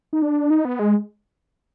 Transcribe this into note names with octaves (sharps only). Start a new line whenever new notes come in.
D#4
D4
D#4
B3
G#3